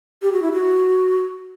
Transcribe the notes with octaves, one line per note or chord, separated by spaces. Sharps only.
G4
F#4
E4
F#4